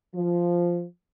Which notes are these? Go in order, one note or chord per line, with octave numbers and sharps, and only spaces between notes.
F3